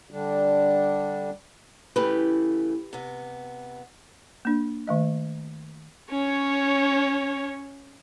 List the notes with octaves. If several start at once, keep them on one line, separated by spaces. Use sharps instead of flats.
D3 G3 D4
C#3 E3 A3 G4 B4
C3 B3
A#3 D4
D#3 A3 D#5
C#4 C#5